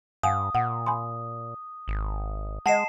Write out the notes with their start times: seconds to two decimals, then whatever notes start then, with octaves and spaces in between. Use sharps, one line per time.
0.23 G2 F5 F#5 G#5 D#6
0.55 A#2 F#5
0.86 G#5 B5 C6
1.88 G#1
2.66 G#3 D#5 F#5 A5 C7 E7